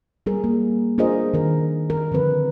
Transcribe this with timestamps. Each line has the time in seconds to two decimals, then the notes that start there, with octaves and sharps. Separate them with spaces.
0.26 G3 G#4 A#4
0.44 A#3
0.98 D4 F4 G#4 A#4 C5 D#5
1.34 D#3 A#4
1.90 A#4
2.12 D3 F3 C4 B4